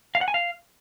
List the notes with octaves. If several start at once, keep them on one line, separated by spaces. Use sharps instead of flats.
F5
F#5
G#5
F5